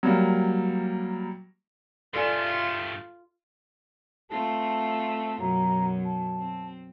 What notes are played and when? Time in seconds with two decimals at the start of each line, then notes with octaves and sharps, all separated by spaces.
0.03 F#3 G3 A#3
2.14 G2 A3 F4 A4 D5 G#5 C6
4.30 A3 C4 F4 A5
5.40 F#2 B2 A#5
6.05 A5
6.38 C4